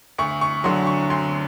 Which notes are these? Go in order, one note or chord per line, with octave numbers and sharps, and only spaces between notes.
D2 C#6
C#6
D3 F#3 C6
C#6
D2 C6